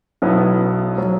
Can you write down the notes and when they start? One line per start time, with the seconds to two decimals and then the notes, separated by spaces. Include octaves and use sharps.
0.22 B1 B2 F#3 B3 E4
0.98 F#3